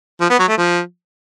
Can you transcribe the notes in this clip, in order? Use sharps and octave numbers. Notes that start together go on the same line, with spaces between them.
F3
B3
F#3
A3
F3